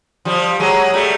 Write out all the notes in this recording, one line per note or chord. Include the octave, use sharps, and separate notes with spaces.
F3 G3
F#3 G#3
G3 A3